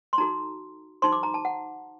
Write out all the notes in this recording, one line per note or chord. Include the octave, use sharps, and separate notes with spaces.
C6
D#4 F#4 A4 A#5
D#4 F#4 A4 C5 C6
D6
A#5
A5
F#5